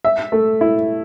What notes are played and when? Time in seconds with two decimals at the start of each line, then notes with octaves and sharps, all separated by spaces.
0.05 E5
0.32 A3
0.61 E4